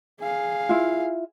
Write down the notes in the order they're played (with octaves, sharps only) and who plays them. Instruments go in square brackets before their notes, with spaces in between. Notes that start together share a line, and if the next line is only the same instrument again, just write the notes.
[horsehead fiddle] G#4 F5
[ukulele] E4 F4